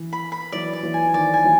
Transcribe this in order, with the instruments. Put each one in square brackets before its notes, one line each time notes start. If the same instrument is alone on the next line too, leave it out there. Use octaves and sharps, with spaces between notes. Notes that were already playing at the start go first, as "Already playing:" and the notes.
Already playing: [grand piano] E3
[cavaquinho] B5
B5
[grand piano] E3 F#3 [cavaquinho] D5
[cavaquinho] D5
[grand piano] E3 F#3
[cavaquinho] G#5
[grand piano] D#3 F3 [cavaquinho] D5
[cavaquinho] G#5
[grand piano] E3 F#3